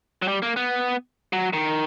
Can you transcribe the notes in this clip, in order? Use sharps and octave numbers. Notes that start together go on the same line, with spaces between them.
F#3
G3
A#3
B3
F#3
D#3